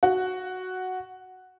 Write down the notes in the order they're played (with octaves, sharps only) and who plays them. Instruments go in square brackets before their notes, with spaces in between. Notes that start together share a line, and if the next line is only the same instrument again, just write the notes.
[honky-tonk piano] F#4